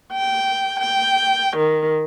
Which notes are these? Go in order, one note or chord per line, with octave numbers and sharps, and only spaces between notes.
G5
G5
D#3